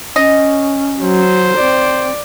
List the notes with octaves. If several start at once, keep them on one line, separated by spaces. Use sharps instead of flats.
C#4 D#5
F#3 C5
C4 D5